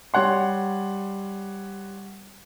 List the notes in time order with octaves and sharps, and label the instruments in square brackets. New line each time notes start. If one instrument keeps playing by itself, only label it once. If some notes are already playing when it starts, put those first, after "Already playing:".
[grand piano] G3 C#5 F#5 C6